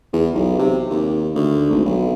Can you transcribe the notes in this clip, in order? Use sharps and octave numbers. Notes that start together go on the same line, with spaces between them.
E2
B1
C3
D#2
D2
G#1
B1